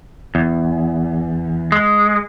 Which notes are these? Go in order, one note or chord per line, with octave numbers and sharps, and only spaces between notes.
E2
G#3